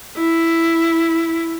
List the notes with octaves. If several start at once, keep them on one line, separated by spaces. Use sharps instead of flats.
E4